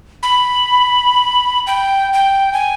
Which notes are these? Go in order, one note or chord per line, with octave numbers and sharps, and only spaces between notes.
B5
G5
G5
G#5